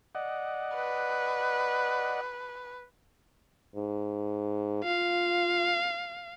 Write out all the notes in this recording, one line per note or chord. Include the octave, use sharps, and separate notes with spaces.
D5 D#5 F#5
B4
G#2
F4 F5